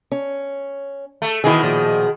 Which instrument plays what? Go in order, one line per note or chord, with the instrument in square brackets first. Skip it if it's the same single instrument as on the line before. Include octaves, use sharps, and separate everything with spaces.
[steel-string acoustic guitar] C#4
[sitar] A3
[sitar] B2 D#3 G#4 [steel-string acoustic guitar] E3 B3 E4
[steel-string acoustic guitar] A#2 F3